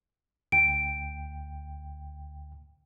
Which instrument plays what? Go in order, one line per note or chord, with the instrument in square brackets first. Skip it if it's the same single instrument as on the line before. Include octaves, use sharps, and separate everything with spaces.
[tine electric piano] D2 G5 [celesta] D7